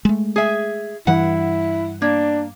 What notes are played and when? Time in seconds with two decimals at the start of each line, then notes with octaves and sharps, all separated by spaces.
0.05 G#3 A3
0.36 G#4 E5
1.07 G2 E3 E4 F#5
2.02 A#3 D4